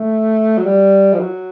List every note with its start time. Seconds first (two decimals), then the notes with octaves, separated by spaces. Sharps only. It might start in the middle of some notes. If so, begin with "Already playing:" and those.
Already playing: A3
0.58 F#3
0.66 G3
1.13 F3
1.19 F#3